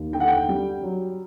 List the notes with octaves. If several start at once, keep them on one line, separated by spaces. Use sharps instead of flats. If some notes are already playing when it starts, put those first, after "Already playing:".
Already playing: D#2
D3 G5
F#5
G5
G3
F#3